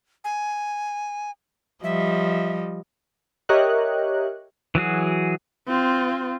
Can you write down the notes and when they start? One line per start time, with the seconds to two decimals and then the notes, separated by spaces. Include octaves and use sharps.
0.24 G#5
1.84 F3 G3 D#5 E5
3.49 G4 A#4 C#5 D#5 E5 F#6
4.75 E3 F#3 F#4 G#4
5.68 C4 F4